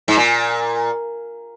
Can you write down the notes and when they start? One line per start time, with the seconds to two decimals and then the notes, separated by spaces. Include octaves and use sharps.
0.08 G#2
0.17 A#2